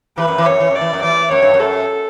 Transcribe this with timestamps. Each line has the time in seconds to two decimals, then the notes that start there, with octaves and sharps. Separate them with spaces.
0.17 E3 B4
0.28 F#2
0.38 E3
0.46 F#2 C#5
0.60 E3
0.71 F#2 D5
0.81 E3
0.93 F#2
1.03 E3 D5
1.31 F#2 C#5
1.42 G2
1.54 F#2
1.60 A4